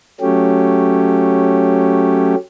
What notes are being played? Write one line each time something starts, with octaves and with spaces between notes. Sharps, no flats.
F#3 A3 C#4 G4